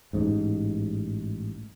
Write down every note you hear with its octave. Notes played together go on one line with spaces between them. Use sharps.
A1 G#2